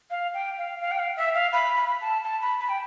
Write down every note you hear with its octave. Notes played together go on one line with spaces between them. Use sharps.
F5
G5
F5
F5
G5
F5
E5
F5
B5
B5
A5
A5
B5
B5
G5